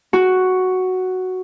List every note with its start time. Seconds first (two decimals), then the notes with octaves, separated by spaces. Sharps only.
0.13 F#4